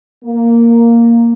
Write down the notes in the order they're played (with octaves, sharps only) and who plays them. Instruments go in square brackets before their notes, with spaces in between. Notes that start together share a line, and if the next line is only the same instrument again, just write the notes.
[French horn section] A#3